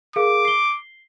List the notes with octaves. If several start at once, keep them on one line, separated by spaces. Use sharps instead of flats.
G#4 A#4 F5 D6
C7 G7